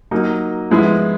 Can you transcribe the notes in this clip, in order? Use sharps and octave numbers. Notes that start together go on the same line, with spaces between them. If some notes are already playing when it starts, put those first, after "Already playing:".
F#3 A#3 D#4
G#2 F3 G#3 B3 E4